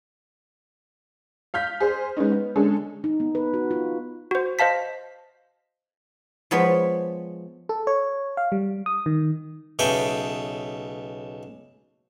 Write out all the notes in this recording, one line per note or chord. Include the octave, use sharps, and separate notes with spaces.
F5 F6 G6 B6
G#4 C5
G#3 B3 C#4 D#4
B3
D3 G#3 C#4 G#4 A4
D#4
B3
B4
F#4
F4
F#4 C5
C5 D#5 F5 A5 B6
F3 G#3 B3 C#5 B5
A4
C#5
F5
G3
D#6
D#3
B1 C#3 A4 B4 E5 G5